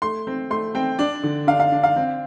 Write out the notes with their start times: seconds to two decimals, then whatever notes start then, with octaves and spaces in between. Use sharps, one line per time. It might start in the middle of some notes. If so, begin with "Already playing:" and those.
0.02 A3 C6
0.27 C4
0.50 A3 C6
0.75 C4 G5
0.99 D4 D5
1.23 D3
1.47 D4 F5
1.60 F5
1.72 D4
1.83 F5
1.96 C4